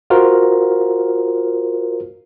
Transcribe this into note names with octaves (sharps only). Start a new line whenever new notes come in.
F4 F#4 A#4 C5